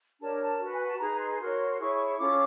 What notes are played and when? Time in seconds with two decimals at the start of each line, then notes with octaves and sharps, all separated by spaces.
0.20 D4 G4 A#4 C#5 A5
0.41 A5
0.60 F#4 B4
0.74 G#5
0.87 A5
1.00 D#4 G#4 B4 A#5
1.20 C6
1.40 F#4 A#4 C#5
1.71 C6
1.80 E4 G#4 C#5 C#6
1.93 C#6
2.06 C#6
2.19 C#4 F4 A4 C#5 D6